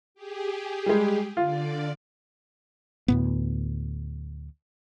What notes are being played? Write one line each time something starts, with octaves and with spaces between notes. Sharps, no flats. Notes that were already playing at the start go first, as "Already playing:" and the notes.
G4 G#4
G3 G#3
D3 F4 D5
D2 A2 B3